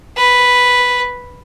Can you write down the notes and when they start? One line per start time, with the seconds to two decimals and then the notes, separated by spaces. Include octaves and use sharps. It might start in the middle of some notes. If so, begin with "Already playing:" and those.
0.17 B4